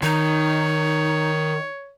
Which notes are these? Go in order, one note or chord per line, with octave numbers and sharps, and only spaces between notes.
D#3 D#4 C#5